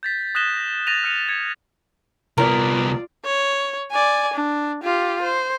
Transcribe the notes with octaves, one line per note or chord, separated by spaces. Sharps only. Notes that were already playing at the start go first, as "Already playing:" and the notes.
G6 A6 B6
D#6 F#6 A#6 B6 E7 G7
A#6
D#6 A6 A#6 D#7 F7
F6 F#6 C#7 D#7 F7
G#6 C#7
C2 B3 F4 A#4 D5
C#5
D5 G#5
D4
F4 G4
C5